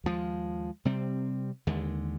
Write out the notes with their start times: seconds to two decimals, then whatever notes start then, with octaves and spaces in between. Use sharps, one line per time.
0.04 D#2 D3 F3 G#3
0.85 C3 G3 C4
1.67 D#2 D3 G#3